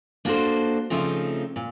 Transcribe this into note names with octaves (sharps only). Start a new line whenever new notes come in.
A#3 D4 F#4 A4 C5
C#3 F3 A3 C4 D#4
A#2